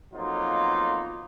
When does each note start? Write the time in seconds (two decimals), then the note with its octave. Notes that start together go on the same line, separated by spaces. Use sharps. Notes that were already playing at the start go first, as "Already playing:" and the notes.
0.13 F2 F#3 A#3 B3 D#4 F4